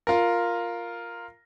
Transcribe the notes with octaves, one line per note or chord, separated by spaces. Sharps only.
F4 A#4